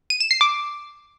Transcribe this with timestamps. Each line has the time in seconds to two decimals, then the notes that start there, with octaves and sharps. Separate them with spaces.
0.10 D#7
0.20 E7
0.31 C7
0.41 D6